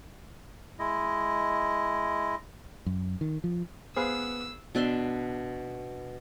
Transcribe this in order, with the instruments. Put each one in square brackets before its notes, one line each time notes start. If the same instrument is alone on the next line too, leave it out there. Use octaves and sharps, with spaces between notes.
[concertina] G#3 E4 D#5
[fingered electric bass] F#2
D#3
F3
[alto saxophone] B3 [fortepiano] G#4 B4 F5 [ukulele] C5 [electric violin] E6
[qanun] B2 D4 E5 C6